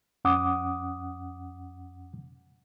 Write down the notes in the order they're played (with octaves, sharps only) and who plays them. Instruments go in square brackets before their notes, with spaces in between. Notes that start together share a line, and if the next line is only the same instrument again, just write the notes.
[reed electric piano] F2 C#4 F#5 D6 D#6